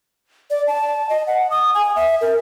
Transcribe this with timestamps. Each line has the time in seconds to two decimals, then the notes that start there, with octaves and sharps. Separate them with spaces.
0.50 D5
0.67 A5
1.09 D#5
1.27 F#5
1.50 D#6
1.74 G#5
1.96 E5
2.21 A#4